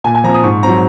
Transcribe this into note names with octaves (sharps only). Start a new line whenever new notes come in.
A#2 G#5
G#5
F3 C4 A#5
D#6
G#2 C#6
F#3 C4 A#5